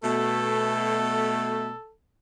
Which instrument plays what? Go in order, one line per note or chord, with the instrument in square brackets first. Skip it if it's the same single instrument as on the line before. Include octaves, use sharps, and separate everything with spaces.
[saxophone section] B2 A3 [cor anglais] A4